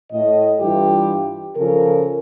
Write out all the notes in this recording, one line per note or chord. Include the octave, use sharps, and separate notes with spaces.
A2 D#5
G2 E3 G3 E4 F4 G4
C#3 F3 A4 A#4